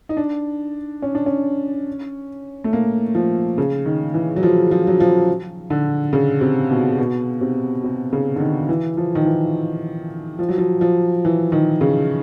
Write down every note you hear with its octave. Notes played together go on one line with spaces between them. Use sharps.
D#4
D4
C#4
D4
C#4
A3
A#3
F3
C#3
D#3
E3
F#3
F3
F3
F#3
F3
D3
C#3
C3
B2
B2
C3
C3
C#3
D3
D#3
E3
F3
D#3
E3
F3
F#3
F3
F3
E3
D#3
C#3